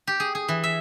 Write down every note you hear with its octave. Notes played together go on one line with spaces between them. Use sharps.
G4
G#4
G#4
E3
E5